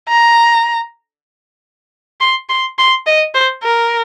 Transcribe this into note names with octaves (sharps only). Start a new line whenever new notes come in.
A#5
C6
C6
C6
D#5
C5
A#4